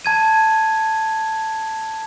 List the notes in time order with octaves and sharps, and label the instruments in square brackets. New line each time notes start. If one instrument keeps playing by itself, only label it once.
[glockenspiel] A5 G#6 D#7